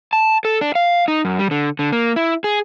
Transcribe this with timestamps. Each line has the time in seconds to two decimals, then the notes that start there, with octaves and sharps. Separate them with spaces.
0.13 A5
0.45 A4
0.61 D4
0.75 F5
1.08 D#4
1.25 F#2
1.39 G3
1.51 D3
1.79 D3
1.93 A#3
2.16 E4
2.44 G#4